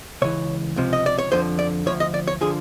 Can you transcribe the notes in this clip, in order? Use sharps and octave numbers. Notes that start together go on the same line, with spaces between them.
C#2 C#3 E3 C#5
C#2 C3 F3
D#5
D5
C#5
F2 D3 F3 C5
D5
D2 C#3 F3 C#5
D#5
D5
C#5
D3 F3 G#4